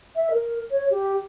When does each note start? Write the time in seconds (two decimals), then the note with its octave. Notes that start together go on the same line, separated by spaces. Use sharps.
0.16 E5
0.30 A#4
0.71 C#5
0.90 G4